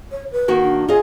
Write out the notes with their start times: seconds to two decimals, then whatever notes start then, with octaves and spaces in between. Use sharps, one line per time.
0.11 C#5
0.32 B4
0.48 D#3 A#3 F#4
0.61 D4
0.89 F4 G#4 D#5